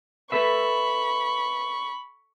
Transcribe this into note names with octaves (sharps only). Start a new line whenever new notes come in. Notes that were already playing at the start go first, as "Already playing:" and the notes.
A4 B4 E5 B5 C#6